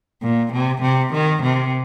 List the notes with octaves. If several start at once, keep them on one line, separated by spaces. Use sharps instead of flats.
A#2
C3
C3
D#3
C3